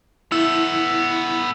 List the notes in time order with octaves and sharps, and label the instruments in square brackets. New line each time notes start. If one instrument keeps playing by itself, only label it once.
[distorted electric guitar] B3 A4 [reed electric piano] E4 [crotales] E6